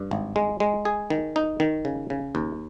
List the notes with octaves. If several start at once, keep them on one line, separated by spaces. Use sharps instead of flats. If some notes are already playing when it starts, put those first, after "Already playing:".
Already playing: G2
G#1
G#3
G#3
G#4
D#3
D#4
D#3
C#3
C#3
D#2